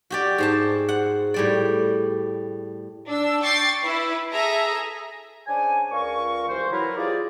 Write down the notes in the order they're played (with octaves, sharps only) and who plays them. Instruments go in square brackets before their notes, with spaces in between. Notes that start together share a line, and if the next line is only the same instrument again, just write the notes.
[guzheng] F#4 G4 D5
G#2 C5 A5
F#5
A2 G3 D5
[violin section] D4 E6
G5 C#6 D6 A6 C7
E4 B4
G#4 A4 E5 A#5
[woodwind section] C#3 D4 C5 C#5 G#5
C#2 F4 A#4 D5 C#6
C2 E3 C5
F#3 E4 A#4 B4
F4 G4 G#4 C5 D5